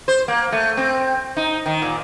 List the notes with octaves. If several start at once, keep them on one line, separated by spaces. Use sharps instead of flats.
C5
A#3
A3
C4
D#4
D#3
A#2